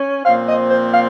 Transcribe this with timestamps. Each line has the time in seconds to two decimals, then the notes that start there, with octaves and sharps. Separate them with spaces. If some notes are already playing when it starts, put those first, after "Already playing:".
Already playing: C#4
0.25 A#2 F3 C4 F5
0.47 D#5
0.69 C5
0.91 F5